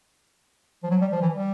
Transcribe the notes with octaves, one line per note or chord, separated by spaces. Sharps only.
F3
F#3
G3
F3
E3
G3